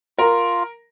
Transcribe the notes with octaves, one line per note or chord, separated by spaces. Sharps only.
F4 A#4